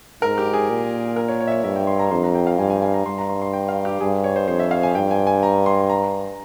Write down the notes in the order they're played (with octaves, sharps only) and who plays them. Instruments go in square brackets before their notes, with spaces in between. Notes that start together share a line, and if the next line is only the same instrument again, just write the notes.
[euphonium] G#2 [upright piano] A#4
[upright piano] G4
G#4
[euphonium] A#2
[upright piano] A#4
C#5
C#5
E5
C#5
[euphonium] G2 [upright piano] E5
[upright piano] G5
C6
A#5
[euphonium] F2 [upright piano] C6
[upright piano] A#5
G5
F5
[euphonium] G2 [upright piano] G#5
[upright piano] G#5
G#5
A#5
[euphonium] G2 [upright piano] C6
[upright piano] A#5
C6
C6
G5
F5
G4
[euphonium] G2 [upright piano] G#4
[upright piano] C#5
C5
[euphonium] F2 [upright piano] C5
[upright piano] E5
F5
G#5
[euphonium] G2 [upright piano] G5
[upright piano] G#5
G#5
A#5
C6
A#5